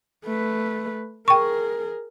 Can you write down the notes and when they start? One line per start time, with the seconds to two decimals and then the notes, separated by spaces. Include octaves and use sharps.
0.25 A3 B4
1.28 G#4 A#4 G5 C#6